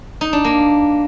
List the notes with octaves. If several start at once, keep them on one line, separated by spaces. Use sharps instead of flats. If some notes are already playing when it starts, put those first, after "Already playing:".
D#4
D4
A#3